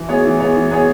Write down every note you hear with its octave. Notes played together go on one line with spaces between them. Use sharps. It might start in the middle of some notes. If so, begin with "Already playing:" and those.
Already playing: E3
B3 G#4 C#5
E3
B3 G#4 C#5
E3
B3 G#4 C#5